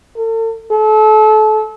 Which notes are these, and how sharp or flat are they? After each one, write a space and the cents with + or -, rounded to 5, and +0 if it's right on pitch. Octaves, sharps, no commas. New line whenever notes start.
A4 +40
A4 -30